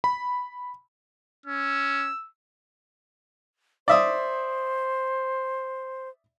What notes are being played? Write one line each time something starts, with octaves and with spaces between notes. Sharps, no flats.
B5
C#4 E6
C5 D5 E5 D#6